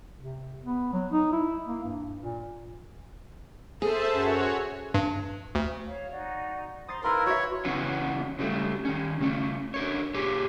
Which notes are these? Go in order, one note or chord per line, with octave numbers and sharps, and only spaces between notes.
C3
B3
F#3
D#4
E4
A#3
G2
A#2
G#4 A4 C5 E5 A5
F#2 F#4 C#5
G2
D2
C#5 F5
D#4 F#4 D5
C5 A#5 C6 D#6 A6 C7
D#4 E4 A#4 B4 F5 C6 E6
F#4 C#5 E5
F#2 C#3 E3 B3 C#4 F#4
C#3 F#3 G3 A3
D#3 C#4
C#3 A3 C#4
D3 A#4 C#5
A#2 G4 G#4 C#5